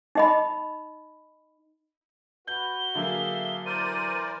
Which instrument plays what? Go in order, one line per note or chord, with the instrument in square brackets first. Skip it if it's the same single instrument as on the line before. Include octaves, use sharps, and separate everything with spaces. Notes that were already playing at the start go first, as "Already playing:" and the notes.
[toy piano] D#4 D#5 B5
[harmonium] F#4 B4 [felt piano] G6 [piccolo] G7
[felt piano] D3 F#3 A#3 [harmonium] G#4 E5 F5
[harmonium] E3 [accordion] A#4 C5 D5 [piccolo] D#7